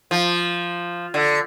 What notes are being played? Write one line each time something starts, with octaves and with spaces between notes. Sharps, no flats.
F3
D3